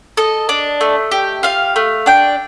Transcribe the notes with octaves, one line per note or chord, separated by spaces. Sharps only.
A4 D#5
D4
A3
G4
F4 F5
A3
D4 G5